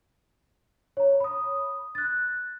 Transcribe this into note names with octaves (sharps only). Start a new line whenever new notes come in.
C#5 A#5
B5 D#6
F#6 A6